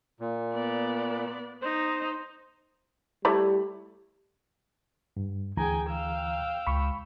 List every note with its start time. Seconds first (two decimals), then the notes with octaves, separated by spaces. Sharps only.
0.20 A#2
0.53 B3 D5
1.62 D#4 C5
3.25 G3 A3 E4 D5
5.17 G2
5.57 D2 E3 G#4 G5 G#5 A#5
5.90 F5 G5 E6
6.67 C#2 B5 C#6